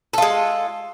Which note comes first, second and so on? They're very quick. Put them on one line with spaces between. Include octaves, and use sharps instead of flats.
A4 F4 G#3